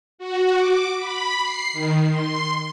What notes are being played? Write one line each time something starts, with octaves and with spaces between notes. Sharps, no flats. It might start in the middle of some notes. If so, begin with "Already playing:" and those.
F#4
D6
B5
C7
D#3
C6